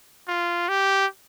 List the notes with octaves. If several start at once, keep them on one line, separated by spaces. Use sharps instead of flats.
F4
G4